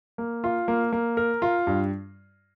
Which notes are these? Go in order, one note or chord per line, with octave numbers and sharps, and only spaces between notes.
A#3
F4
A#3
A#3
A#4
F4
G2